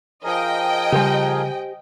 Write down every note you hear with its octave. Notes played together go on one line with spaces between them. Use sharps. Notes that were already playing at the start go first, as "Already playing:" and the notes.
F3 G#4 A#4 D#5 G5
C#3 G3 G4 C5 G#5